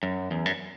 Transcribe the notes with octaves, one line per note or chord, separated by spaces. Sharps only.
F#2
E2
F#2